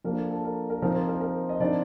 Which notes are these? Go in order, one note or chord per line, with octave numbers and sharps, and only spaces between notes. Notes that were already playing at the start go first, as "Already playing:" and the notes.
F3 A#3 D4 A#4
A4
A4
A#4
A#4
F3 C4 D#4 A#4
C4 C5
A#4
A#4
D#5
F3 C4 D4 D#4 D5